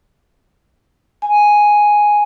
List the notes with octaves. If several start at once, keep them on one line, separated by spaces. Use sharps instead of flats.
G#5